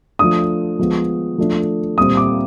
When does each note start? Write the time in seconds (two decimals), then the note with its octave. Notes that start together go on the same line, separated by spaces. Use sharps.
0.19 F3 A3 D4 D#6
0.79 F3 G#3 B3
1.38 F3 A3 D4
1.97 A#2 G3 C4 D#6
2.17 D6